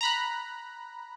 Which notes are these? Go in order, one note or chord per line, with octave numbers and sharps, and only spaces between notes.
A#5 B5 F#6